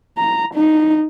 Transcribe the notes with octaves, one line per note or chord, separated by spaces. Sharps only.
A#5
D#4